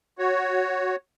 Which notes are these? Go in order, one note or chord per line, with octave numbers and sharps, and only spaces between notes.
F#4 C#5